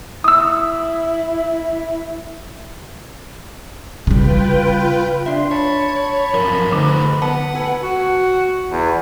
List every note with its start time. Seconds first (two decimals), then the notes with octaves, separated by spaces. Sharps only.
0.24 E4 D#6 E6
4.07 C#3 G3 F4 B4 G5
5.26 D4 E5 C6
5.51 C#5 A5 B5
6.34 F#2 F3 A#4
6.72 D3 A3 D#4 B4
7.22 B3 F#5 A5
7.55 A4 B4 G#5
7.82 F#4
8.70 E2